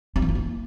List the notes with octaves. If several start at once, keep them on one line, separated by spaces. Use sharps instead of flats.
D4
E3
F4
A#3